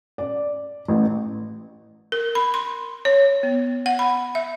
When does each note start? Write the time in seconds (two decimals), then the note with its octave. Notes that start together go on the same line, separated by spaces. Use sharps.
0.18 D5
0.88 A1
2.12 A#4
2.35 B5
2.54 C6
3.05 C#5
3.43 B3
3.86 F#5
3.99 B5
4.35 E5